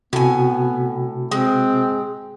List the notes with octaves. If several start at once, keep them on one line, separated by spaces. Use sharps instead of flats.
A2 C3 B3 F#4 G#5
G#3 C4